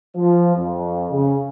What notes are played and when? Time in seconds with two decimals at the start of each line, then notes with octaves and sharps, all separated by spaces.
0.16 F3
0.56 F2
1.11 C#3